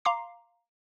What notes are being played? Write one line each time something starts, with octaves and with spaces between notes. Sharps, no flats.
F5 A#5 C6 D6 C7